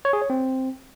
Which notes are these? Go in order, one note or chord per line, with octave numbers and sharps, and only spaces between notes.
C#5
G#4
C#5
C4